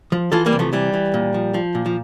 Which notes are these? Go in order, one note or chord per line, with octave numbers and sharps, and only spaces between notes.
F3
E3 F4 A4
G3 A#3
C3
F3 A3
E3 G3
E3
A#2
F3
F3
A#2
F3